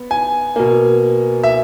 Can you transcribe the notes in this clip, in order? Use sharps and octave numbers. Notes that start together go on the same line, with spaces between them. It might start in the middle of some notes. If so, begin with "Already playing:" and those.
Already playing: B3
G#5
B2 A#3
E5